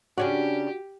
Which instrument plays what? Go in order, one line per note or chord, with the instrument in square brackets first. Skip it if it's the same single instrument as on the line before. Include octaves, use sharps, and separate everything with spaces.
[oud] C#3 C#4 D4 [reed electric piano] F#4 [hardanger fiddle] G4